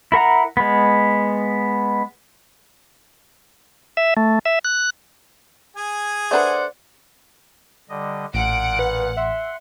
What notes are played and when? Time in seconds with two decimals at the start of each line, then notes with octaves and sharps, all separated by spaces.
0.12 E4 A#4 F#5 A#5
0.57 G#3 B3
3.97 E5
4.17 A3
4.45 E5
4.64 F#6
5.76 G#4 G#5
6.31 A3 D4 B4 C5 D5 F#5
7.89 D3 G3 D#5
8.34 A1 A#2 F#5 D7
8.79 B4
9.17 E5 F#5 C6